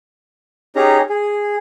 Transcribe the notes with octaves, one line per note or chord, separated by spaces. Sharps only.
C#4 D#4 G4 G#4 A#5
G#4